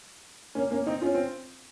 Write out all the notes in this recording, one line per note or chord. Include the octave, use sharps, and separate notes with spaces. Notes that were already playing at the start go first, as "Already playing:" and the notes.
A#3 C#4
A#3 C#4
C4 D#4
C#4 F4
C4